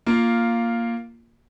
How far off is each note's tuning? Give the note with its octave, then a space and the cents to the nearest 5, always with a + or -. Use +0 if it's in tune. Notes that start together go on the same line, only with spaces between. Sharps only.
A#3 +0 F4 +0